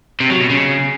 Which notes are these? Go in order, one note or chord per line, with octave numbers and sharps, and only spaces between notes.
C3
F#3
B2
C#3